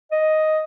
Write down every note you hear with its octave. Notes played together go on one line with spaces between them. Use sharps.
D#5